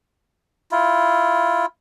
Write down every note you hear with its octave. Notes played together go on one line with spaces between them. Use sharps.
E4 F4